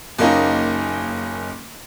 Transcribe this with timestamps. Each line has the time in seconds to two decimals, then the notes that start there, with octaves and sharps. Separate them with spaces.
0.18 F#1 A#3 C#4 D#4